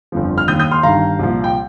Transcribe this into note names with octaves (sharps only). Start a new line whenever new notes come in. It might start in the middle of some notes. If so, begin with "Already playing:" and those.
G1 F2 F3
F6
D#2 D#3 D#6 G6
D#6 G6
C6 F6
G1 G2 D#3 F5 A#5
C2 A#2 F3
G5